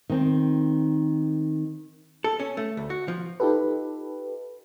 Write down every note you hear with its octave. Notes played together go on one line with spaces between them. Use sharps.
D#3 C4
A4
C#4
A3
D2
F#4
F3
D#4 F4 G4 A4 B4